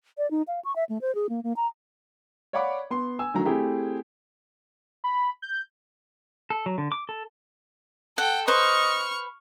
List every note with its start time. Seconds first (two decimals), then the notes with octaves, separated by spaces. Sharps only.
0.18 D5
0.31 D#4
0.48 F5
0.65 C#6
0.76 E5
0.89 A3
1.02 C5
1.15 G#4
1.29 A#3
1.44 A#3
1.56 A#5
2.53 C#5 D5 F5 F#5 B5 D6
2.90 B3 C6
3.19 G#5 E6
3.34 D2 D#3 F#3 A#5
3.45 A3 C4 E4 G4 G#4
5.04 B5
5.42 G6
6.50 A4
6.66 F#3
6.78 D3
6.92 D6
7.09 A4
8.18 A4 F#5 G5
8.48 B4 C5 D#5 B5 C#6 F6